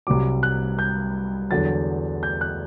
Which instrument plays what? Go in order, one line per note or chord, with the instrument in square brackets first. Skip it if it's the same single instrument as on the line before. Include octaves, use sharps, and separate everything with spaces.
[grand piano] C2 C3 F#3 D6
F#6
G6
E2 D3 F#3 A6
G6
F#6